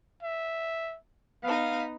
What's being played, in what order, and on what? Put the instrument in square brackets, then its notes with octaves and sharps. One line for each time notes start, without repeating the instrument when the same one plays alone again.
[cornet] E5
[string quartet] B3 D#4 [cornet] F5